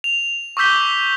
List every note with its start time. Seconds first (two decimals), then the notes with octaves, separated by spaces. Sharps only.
0.04 F7
0.57 C#6 D6 E6 G6 B6 G7